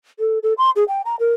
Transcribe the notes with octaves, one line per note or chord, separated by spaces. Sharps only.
A4
A4
C6
G#4
G5
A#5
A#4